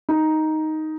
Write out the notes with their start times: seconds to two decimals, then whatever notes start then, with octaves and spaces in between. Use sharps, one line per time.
0.09 D#4